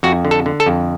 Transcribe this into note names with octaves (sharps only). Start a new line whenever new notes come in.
F2 F#4
D3
A4
D3
A4
F2